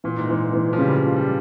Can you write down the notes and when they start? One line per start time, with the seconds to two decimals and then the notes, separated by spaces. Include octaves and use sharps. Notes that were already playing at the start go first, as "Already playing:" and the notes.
0.04 A#2 E3
0.18 G#2
0.29 A#2 E3
0.53 E3
0.73 F3
0.78 C#3 G3
0.97 F3
1.03 F4
1.16 G3